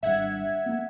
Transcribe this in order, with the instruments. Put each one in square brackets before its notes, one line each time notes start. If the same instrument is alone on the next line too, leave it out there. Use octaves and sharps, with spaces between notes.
[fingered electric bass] G#1 G2 [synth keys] E5 F#5 G#6
[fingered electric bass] A#3 B3